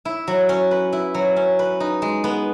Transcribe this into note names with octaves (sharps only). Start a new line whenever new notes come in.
E4
F#3
C#4
B4
E4
F#3
C#4
B4
D#4
G#3
B3